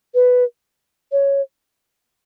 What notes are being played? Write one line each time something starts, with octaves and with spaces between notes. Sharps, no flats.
B4
C#5